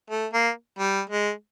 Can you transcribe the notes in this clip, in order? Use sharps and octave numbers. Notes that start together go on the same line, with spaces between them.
A3
A#3
G3
G#3